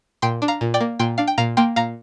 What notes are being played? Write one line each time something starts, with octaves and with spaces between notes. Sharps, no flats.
A#2 G5 C6
D4
F5 A#5
A#2
D5 G5
A#3
A#2 G5 C6
D4 F5
G5
A#2 F5 A#5
A#3 G5 C6
A#2 F5 A#5